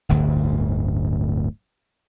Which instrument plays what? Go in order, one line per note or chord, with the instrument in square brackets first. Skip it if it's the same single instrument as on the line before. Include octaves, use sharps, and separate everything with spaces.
[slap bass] D1 G1 D2